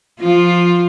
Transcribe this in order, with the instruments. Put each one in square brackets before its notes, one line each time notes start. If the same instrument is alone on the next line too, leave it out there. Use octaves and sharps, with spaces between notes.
[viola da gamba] F3 F4